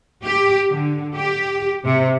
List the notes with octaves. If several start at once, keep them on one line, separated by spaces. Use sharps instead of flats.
G4
D3
G4
C3